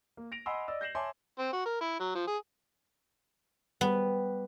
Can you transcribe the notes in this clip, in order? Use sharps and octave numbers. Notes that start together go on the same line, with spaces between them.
A#3
A#6 D7 F7
D#5 F#5 G#5 B5 C6 E6
D5 D#5 E6
G6 A#6 C7 E7 F#7
C#5 E5 G#5 A5 C6 D6
C4
F#4
A#4
E4
F#3
F3
G#4
G3 B3 B4